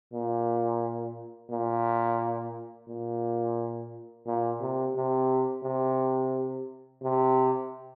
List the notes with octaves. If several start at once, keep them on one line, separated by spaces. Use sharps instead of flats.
A#2
A#2
A#2
A#2
C3
C3
C3
C3